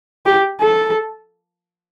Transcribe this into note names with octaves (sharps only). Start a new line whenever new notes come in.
G4
A4